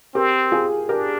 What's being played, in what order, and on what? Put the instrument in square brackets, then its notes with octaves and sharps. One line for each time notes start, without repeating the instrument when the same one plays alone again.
[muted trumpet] C4 [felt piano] G4 A#4
[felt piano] F4 G#4
[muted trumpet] D4 [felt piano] G4 A#4